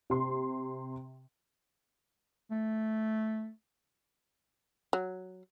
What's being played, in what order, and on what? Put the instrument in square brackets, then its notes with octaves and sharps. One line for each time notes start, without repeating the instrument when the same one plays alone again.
[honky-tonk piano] C3 C6
[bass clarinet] A3
[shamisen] F#3